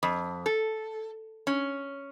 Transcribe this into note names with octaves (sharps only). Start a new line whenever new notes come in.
F2
A4
C#4